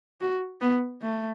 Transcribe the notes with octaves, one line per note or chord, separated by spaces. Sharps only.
F#4
B3
A3